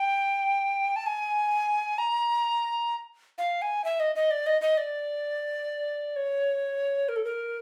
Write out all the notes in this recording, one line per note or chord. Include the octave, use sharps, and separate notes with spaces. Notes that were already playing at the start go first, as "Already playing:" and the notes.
Already playing: G5
A5
G#5
A#5
F5
G#5
E5
D#5
D#5
D5
D#5
D#5
D5
C#5
A#4
A4
A#4